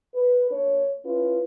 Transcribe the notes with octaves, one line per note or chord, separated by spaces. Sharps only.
B4
A#3 D4 C#5
C#4 E4 F4 B4